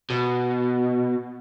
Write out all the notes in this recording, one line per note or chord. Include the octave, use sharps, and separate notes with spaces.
B2